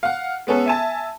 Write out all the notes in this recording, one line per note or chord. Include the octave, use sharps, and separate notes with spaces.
F5 F#5
G#3 B3 C#4 A4
E5 G#5 A5